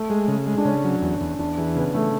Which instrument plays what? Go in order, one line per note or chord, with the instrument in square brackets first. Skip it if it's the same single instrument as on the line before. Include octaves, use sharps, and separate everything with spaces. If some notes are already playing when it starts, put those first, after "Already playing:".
Already playing: [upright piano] A3
[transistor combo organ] G#3
C#3
G#3
[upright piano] D4
[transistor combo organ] C#3 [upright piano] C#4
[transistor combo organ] F#3
E2
E2
[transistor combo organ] E2 [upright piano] D4
[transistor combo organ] E3 [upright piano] G#4
[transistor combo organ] C#3 [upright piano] B3
[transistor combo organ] E3 [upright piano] A3